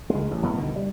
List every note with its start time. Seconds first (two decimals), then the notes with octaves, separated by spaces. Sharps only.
0.10 C#2 G#3
0.31 A1
0.42 A#1 F2 A2 B3
0.56 C2 B2 D3 D#3
0.76 G3